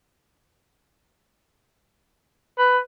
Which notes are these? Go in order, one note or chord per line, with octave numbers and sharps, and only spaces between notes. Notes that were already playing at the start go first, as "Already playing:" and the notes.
B4